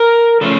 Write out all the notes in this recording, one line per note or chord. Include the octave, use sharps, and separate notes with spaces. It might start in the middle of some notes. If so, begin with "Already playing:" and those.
Already playing: A#4
C#3 F3 A3 A4